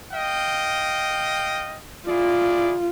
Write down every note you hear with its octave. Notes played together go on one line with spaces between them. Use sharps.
D#5 F5 G5
E4 F4 G#4 D5